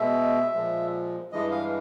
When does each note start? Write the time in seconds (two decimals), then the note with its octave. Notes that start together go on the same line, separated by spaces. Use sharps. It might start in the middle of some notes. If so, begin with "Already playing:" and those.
Already playing: B2 G#3 E5
0.54 A#2 F3 G#3
1.32 G2 E3 G#3 D#5
1.51 F5